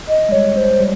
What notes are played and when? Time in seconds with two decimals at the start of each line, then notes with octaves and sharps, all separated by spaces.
0.09 D#5
0.29 G#3
0.32 G3 C#5
0.57 C5
0.80 G3